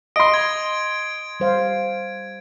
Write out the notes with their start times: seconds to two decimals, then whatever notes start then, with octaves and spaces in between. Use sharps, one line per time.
0.16 D#5 C6 D7
0.34 G#6
1.40 G3 C5 F5